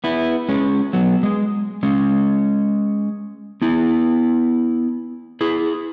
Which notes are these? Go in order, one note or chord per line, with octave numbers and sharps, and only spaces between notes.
B3 E4
G#3 C#4
F#3 B3
G#3
G#3 C#4
B3 E4
E4 G#4